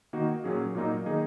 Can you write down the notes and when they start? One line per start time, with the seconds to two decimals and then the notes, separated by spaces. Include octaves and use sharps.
0.13 D#3 A#3 D#4 F#4
0.44 A#2 F#3 C#4 G#4
0.75 A#2 F#3 A#3 D#4
1.06 D#3 A#3 D#4 G#4